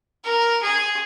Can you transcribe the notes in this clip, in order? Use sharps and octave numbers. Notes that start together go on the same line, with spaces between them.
A#4
G#4